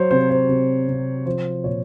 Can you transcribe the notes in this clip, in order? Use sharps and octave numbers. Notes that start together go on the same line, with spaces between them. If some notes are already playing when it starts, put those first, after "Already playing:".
Already playing: F#3 C5 C#5
C3 C5
C5
C3
C3
F3 C5
A#2 C#5